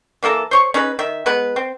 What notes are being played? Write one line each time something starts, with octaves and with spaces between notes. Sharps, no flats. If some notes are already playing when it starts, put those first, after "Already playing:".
E3 A#3 A4 A#4
C5 C#5 C#6
C#4 D#4 G#4 B4
D#3 E5
G#3 B3 B4
C4